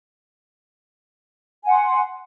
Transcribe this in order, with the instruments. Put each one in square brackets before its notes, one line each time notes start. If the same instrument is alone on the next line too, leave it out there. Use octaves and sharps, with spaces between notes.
[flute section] G#5
F#5
C6